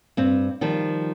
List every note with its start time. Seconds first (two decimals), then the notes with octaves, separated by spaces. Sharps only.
0.17 G2 C4
0.61 D#3 F3 G3